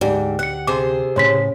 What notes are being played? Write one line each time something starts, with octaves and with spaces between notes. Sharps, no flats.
D2 G#2 G4 D5
F#5 F#6 C#7
C3 G#4 C5 D6
A2 C#3 C#5 C6 B6